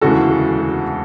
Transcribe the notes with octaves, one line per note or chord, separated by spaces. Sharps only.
E1 D2 C#3 E3 G#3 F#4 A4